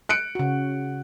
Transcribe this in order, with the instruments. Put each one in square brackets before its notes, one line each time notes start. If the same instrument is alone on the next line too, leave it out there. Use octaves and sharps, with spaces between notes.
[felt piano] F#6 C#7 D7
[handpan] C#3 F#4